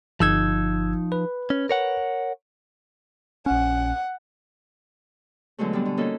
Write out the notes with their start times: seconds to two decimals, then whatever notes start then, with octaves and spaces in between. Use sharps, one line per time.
0.20 G1 F3 D#4 E6 G#6
1.12 B4
1.50 C#4
1.69 A#4 C#5 F#5
3.46 A#1 C#4 F#5
5.58 B2 D3 F#3 G#3 A3
5.73 G3 G#3 B3 D4
5.85 D3
5.97 A#3 C#4 D#4 F#4 A4